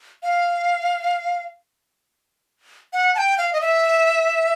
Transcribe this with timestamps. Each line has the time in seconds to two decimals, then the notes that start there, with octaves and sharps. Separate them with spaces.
0.23 F5
2.93 F#5
3.15 A5
3.18 G5
3.38 F5
3.53 D#5
3.61 E5